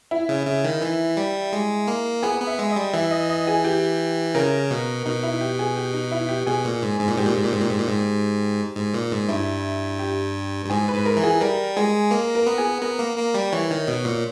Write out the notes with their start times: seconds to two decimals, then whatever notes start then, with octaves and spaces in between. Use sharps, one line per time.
0.11 E4
0.29 C#3
0.47 C#3
0.64 D#3
0.82 E3
1.17 G3
1.52 G#3
1.87 A#3
2.23 B3 G#4
2.40 B3
2.47 E5
2.59 G#3
2.71 D#5
2.76 G3
2.93 E3 E5
3.11 D#5
3.30 D#5
3.47 G#4
3.64 G4
4.35 C#3 A#4
4.71 B2
5.05 B2 D#4
5.23 E4
5.41 G4
5.59 G#4
5.76 G4
5.93 D#4
6.11 E4
6.29 G4
6.46 B2 G#4
6.65 A#2
6.82 G#2
7.00 G#2
7.08 A#2
7.17 G#2 G4
7.26 A#2
7.35 G#2
7.44 A#2
7.53 G#2
7.61 A#2
7.70 G#2
7.79 A#2
7.88 G#2
8.76 G#2
8.94 A#2
9.12 G#2
9.28 G2 E4
9.99 G4
10.65 G2
10.70 G#2 G#4
10.88 B4
10.94 G#2
11.06 A#4
11.17 E3
11.23 G#4
11.41 G3 A#4
11.77 G#3 G#4
12.11 A#3 A#4
12.35 A#4
12.46 B3
12.58 G#4
12.82 B3 A#4
12.99 A#3
13.18 A#3
13.35 G3
13.52 E3 C#5
13.71 D#3
13.87 B2
14.05 A#2